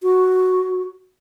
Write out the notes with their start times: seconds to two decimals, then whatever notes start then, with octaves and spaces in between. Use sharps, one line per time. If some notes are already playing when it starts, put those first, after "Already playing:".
0.03 F#4